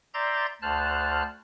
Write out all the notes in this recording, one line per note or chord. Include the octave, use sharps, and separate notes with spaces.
D5 E5 A#5 C6 G6 A6
D2 C5 A5 F6 F#6